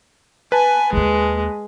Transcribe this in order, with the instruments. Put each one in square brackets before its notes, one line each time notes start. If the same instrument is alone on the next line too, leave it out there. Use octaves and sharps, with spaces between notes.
[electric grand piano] B4 A5 [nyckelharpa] G#5
[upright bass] D#2 A#3 [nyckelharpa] G#3